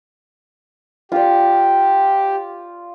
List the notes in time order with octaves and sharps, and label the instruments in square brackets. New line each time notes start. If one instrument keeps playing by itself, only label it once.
[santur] F4 D5 [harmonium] G4